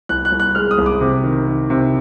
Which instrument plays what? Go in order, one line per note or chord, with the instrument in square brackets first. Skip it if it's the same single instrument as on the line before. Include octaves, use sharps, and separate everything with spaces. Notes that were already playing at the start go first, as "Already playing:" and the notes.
[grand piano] C2 F#6
F#6
C2
F#6
G#3 F6
D#6
C2
D6
C3
D#3
D#3
C3